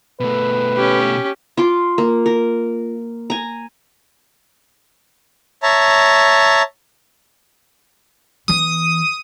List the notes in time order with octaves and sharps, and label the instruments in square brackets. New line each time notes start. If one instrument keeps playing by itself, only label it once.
[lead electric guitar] B2 A3 [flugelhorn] B4
[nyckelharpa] C#4 G4
[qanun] F4 C6 D6
A#3
A#4
G#5 A#5
[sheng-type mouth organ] C#5 E5 A5 A#5
[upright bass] E3 B3 [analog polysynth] D#6